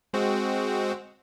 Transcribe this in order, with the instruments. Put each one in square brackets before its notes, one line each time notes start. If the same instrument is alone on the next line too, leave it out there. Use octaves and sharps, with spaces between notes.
[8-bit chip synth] G#3 C4 F#4